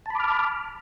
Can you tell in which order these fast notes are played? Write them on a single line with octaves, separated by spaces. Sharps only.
A5 B5 D6 F6